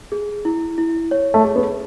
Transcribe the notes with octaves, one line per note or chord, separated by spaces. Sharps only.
G#4
E4
E4
C#5
A3
G#4
B3